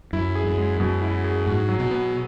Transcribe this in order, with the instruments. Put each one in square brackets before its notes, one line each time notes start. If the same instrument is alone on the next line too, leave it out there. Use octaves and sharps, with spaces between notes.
[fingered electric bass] F#2 [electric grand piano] E4
[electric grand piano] G#4
[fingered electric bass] F#2
[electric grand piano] G#3
[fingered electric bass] F#2 [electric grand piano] B2
[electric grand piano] E4
G#4
[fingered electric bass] G#2 [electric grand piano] F#4
[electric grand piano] F#3
[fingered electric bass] B2
[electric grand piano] B3